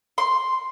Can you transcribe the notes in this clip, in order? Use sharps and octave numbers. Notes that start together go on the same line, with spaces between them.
C6